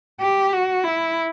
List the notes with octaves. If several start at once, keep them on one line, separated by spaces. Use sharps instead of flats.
G4
F#4
E4